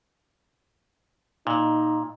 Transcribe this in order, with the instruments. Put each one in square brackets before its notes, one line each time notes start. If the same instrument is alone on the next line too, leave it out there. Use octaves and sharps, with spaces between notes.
[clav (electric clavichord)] A#2 [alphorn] D#4